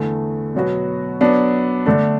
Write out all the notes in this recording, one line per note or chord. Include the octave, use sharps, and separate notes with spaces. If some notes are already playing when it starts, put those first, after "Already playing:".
Already playing: E2 D3 A3
B2 F#3 B3 F#4
F#3 B3 D4
D3 A3 D4